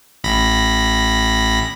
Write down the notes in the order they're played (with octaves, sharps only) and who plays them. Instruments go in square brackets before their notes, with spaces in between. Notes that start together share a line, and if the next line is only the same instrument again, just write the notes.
[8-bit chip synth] A1 B5 A#6